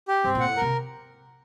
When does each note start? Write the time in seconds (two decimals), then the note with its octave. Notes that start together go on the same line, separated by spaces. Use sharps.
0.08 G4
0.24 G2 C4
0.35 A#2
0.40 F#5
0.46 A2
0.56 A#4
0.62 C3